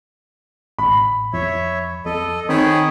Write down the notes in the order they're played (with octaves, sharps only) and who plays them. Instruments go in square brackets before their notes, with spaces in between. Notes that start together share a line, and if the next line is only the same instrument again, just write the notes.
[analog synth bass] A1 [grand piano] B5
[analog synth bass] F2 [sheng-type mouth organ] C#5 E5
[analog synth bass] F2 [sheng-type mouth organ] A4 D#5
[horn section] D#3 [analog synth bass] C4 [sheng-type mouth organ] G#4 C#5 B5